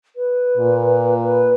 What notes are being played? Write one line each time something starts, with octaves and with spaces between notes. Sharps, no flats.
B4
A#2
B4